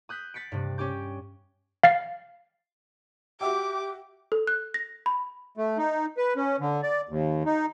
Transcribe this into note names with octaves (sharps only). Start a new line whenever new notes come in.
D#6 F#6 G6 B6
F#6 A6 B6 C#7 D7
G2 C3
C#4 G4 D6 G6
F5 A6 C7
F#4 G4 E5 G5 D6
A4
F#6
A#6
B5
A3
D#4
B4
C#4
D3
D5
D#2
D#4